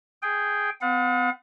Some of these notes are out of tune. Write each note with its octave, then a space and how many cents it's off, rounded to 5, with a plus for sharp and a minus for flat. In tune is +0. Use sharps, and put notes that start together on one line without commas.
G#4 +0 G5 +0
B3 +45 F#5 -45